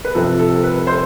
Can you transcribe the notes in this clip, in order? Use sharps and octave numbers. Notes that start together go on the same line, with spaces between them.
B4
C3 F3 A4
A4
B4
C5